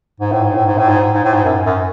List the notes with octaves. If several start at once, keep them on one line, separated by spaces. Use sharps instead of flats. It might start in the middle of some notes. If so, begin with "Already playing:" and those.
G#2
A2
G#2
A2
G#2
A2
G#2
G#2
A2
G#2
F#2
F#2